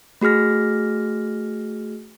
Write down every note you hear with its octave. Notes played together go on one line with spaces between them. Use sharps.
A3 F#4 G#4 F6 A#6